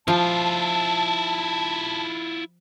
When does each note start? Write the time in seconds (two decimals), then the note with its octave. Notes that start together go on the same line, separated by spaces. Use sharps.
0.08 F3 E4 F4 A5